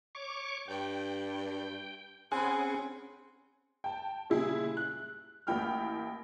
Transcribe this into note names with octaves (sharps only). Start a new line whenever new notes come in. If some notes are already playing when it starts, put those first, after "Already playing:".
C#5 C#6 D6
G2 G5
C4 C#4 G#4 F#5 G#5 B5
G5 A5
A#2 C#3 G3 G#3 E4 G#4
F#6
A1 A#3 E4 G5 B5 F6